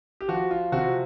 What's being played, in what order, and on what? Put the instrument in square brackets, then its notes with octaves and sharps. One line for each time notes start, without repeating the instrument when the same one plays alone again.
[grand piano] G4
F3 F#4
F4
C3 F#4